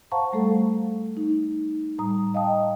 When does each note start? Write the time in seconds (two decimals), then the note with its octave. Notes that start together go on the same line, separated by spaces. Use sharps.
0.12 C5 F5 F#5 A5 A#5 C#6
0.32 G3 A3 A4
1.17 D#4
1.99 A2 G3 A#5 D#6
2.34 D#5 F5 G5 A5 D#6